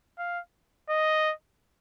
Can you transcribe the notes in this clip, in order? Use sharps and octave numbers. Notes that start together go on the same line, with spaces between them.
F5
D#5